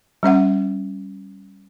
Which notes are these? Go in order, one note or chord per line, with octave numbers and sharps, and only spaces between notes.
G3 C#4 E5 F#5